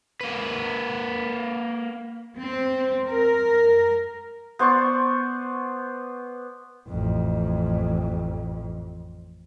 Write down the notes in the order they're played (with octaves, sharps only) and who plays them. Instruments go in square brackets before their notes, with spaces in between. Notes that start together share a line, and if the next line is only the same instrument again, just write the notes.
[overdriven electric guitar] A#3 B4
[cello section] C4
A#4
[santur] B3 C5 D5 C#6
[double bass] A1 F2